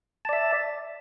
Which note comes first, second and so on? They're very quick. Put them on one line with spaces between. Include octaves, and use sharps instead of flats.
A5 D5 E5